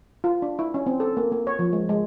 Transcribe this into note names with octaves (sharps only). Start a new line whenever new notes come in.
F4
D4
E4
C#4
C4
A4
A#3
A#3
C#5
F3
G#3
G#3